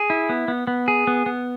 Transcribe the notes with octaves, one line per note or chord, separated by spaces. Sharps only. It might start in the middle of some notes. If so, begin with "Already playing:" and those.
Already playing: G#4
E4
B3
B3
B3
G#4
B3
B3